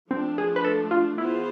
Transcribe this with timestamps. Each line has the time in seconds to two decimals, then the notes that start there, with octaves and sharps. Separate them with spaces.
0.11 F3 A3 C4 D4
0.38 G#4
0.56 B4
0.64 A4
0.91 F4
1.18 E3 B3 E4 F4 G#4 C5